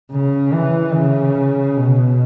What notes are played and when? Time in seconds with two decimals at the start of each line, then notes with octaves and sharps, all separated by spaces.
0.11 C#3
0.53 E3
0.94 C#3
1.77 B2